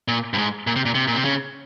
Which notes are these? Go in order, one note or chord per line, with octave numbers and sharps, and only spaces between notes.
A#2
G2
G#2
A#2
C3
A#2
C3
A#2
C3
C#3